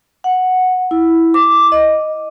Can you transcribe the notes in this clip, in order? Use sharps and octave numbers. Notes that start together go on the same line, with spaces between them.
F#5
E4
D6
D#5